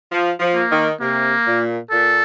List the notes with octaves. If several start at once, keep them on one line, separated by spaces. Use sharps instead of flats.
F3
F3
A#3
D#3
C3 A#3
A#2
A#2 A4